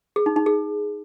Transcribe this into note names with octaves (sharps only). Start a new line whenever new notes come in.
G#4
D#4
D#4
G#4